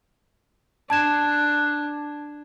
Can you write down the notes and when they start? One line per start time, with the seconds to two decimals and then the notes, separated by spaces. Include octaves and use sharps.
0.90 D4 A5 G#6 E7